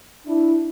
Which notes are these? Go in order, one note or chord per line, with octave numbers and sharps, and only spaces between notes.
D4 E4